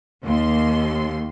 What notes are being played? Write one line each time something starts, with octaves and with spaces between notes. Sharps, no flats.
D#2 C6